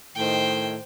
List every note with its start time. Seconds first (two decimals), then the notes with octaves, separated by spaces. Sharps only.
0.16 A2 D#3 C5 G5